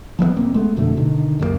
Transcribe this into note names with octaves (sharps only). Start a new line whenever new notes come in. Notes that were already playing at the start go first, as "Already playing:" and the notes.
F3 G3 A3 B3
E1 A#3 C4
G#3 A3 B3
F2 B2 D3 A3
B2 D3 D#3
C#2 F#2 F#3 A#3